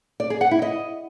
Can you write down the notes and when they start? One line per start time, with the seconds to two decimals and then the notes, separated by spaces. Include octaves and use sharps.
0.20 D5
0.30 G#4
0.41 F#5
0.51 E4
0.62 D#5